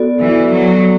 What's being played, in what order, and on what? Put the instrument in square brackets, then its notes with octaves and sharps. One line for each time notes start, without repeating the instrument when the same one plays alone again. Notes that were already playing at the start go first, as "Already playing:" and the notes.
Already playing: [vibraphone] B3 F#4 A4 D5
[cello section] E3
F#3